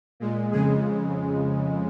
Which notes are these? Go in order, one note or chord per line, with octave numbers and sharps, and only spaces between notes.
A#2 G#3
F2 C#3 G#3 G#4